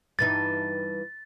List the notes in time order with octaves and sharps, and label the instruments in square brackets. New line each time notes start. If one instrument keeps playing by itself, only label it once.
[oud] G2 E3 D#4 [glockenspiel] A6